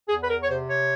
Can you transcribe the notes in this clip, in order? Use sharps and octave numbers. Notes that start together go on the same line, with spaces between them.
E2 G#4
B4
A#4
C#5
C3 C5
C#5